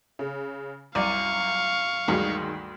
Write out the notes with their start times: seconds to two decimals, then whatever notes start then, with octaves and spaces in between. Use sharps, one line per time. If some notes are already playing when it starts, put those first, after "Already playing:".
0.19 C#3
0.95 C2 F#2 D5 F5 C#6 D#7
2.08 D2 G2 D#3 F#3 G#3